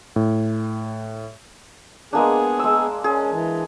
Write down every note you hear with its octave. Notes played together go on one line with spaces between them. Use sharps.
A2
G#3 A#3 B3 D4 G#4
G#3 E6
C#4 G#4
E3